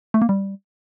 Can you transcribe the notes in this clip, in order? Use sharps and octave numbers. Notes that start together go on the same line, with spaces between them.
A3
A#3
G3